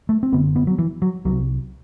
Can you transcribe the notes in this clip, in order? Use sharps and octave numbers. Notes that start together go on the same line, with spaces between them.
A3
C4
F#1 F#2 D3 B3
B3
F#3
E3
F#3
C2 C3 F#3